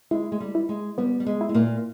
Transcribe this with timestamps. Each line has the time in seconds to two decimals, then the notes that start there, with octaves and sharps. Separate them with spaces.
0.11 G#3 E4
0.32 G#3
0.40 G3
0.55 E4
0.69 G#3
0.98 G3 B3
1.20 G3
1.26 G#3
1.41 E4
1.49 G#3
1.54 A#2 A#3